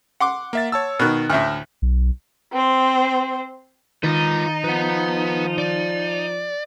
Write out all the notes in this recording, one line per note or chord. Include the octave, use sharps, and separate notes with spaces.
F#5 C6 D6
A#3 E5 A6
C#5 A5 E6
B2 D#3 F6 F#6
D2 A2 E5 F6
B1
C4 C5
D#3 D#4 F4 B4 A6
F3 B4 F#5
D5